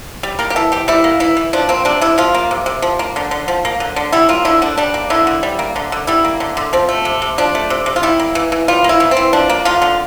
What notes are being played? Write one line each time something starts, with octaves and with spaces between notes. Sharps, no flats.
G3
A#3 A#4
G4
E3 A4
E3 G4
G3 E4
A#3
E3 E4
E3
F3 D4
A#3 C4
C3 D4
C3 E4
F3 F4
A#3
C3
C3
F3
A#3
D3
D3
F3
A#3
D3
D3
G3 E4
A#3 F4
D3 E4
D3 D4
G3 D4
A#3
D3 E4
D3
G3
A#3
D3
D3
G3 E4
A#3
D3
D3
F3 C4
A3
C3
C3
F3 D4
A3
C3
C3
F4
G3 E4
A#3
E3
E3
G3 F4
A#3 E4
E3
C4
E3
F3 D4
A#3
D3 F4
D3